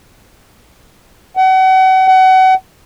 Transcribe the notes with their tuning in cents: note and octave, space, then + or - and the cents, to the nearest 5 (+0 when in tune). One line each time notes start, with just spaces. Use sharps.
F#5 +35
F#5 +30